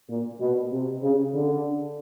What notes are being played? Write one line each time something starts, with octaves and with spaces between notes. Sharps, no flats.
A#2
B2
C3
C#3
D3